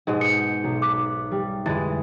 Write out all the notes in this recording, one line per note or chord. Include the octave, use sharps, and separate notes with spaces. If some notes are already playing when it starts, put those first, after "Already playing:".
G#2 B2 G#3 G#4 D#5
D#6 G6 C#7
B1
D6 F#6 B6
G3
F2 D3 E3 G#3 A6